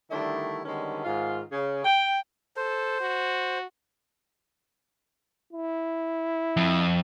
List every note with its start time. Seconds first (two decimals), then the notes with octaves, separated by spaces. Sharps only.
0.11 D3 D#3 G3 A3 D4 E4
0.65 D3 D#3 G3 G#3 B3 C#4
1.05 G#2 D#3 F4
1.52 C#3
1.84 G5
2.56 A4 C5
3.01 F#4
5.53 E4
6.57 F2